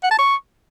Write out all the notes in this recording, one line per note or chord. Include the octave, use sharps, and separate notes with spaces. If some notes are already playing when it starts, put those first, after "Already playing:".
F#5
A5
C#6